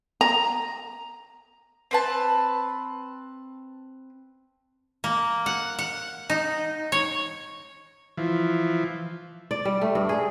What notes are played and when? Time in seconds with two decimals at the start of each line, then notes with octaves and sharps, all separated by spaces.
0.21 A#5
1.91 C4 B4 A5
5.04 A#3
5.46 F#5
5.79 F#5
6.30 D#4
6.92 C#5
8.17 E3 F3
9.51 D5
9.65 G3
9.81 A3
9.95 G2
10.09 G#4